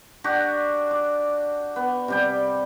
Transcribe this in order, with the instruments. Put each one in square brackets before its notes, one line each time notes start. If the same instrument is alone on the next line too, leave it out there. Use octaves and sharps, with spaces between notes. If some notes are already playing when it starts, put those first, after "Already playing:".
[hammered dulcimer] D4 F#4 G4
D6
B3
C3 G3 G5